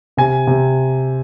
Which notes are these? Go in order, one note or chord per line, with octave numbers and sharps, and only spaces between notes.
C3 G#5
C3